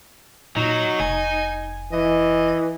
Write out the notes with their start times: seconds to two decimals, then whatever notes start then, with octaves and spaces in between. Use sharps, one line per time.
0.56 A#2 F#3 D#4
1.00 F1 G#5
1.92 E3 D#5